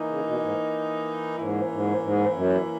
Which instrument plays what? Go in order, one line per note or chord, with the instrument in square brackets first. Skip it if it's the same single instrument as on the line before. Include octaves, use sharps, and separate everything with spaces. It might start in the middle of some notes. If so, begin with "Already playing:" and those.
Already playing: [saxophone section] E3 A#3 D#4
[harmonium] C#3
B2
G#2
[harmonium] G#2 [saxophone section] E3 A#3 C#4 E4
[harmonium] G#2
G#2
F#2